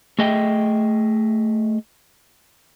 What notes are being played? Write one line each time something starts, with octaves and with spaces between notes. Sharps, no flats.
A3 G#4 D#5 E5 G5